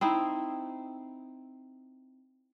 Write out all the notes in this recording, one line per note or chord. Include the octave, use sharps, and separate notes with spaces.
C4 D#4 E4